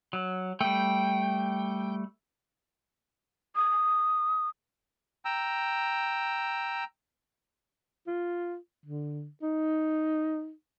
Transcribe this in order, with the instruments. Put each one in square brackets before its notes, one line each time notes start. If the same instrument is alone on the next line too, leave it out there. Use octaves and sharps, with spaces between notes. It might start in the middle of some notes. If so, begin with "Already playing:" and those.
[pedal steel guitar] F#3
[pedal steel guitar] G3 A3 [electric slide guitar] G5
[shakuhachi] D#6
[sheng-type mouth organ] G5 A#5 E6
[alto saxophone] F4
D3
D#4